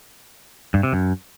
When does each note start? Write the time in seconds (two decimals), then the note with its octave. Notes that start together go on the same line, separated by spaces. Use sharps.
0.74 G2
0.83 C3
0.93 F#2